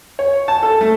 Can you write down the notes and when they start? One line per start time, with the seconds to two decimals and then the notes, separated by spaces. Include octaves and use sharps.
0.19 C#5
0.48 A5
0.63 A4
0.81 A3